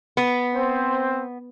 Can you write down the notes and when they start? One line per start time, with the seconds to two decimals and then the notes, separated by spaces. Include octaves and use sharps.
0.17 B3
0.54 C4 C5